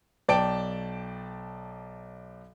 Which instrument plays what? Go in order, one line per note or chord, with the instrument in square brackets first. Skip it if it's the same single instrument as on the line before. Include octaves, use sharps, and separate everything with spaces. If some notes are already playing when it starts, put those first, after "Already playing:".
[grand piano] B1 D5 G5 A5 D7